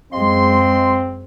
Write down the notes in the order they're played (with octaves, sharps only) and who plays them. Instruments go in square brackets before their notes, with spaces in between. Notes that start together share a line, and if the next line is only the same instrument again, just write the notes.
[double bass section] F#2 G#3 [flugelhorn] C4 [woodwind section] F4 D#5 C6